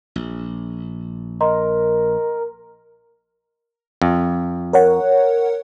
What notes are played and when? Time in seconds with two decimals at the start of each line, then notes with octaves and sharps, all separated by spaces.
0.16 A#1
1.41 A#4 D#5 A#5 C6
4.02 F2
4.73 A#4 C#5 F#5